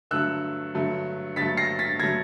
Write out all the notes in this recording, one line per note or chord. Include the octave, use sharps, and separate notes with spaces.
G2 D3 F#3 A3 E6 F#6
G2 D3 F#3 A3
G2 D3 F#3 A3 A6 B6
A#6 C7
A6 B6
D3 F#3 A3 G#6 A#6